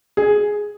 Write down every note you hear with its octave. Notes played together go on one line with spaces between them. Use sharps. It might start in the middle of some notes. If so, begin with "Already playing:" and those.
G#4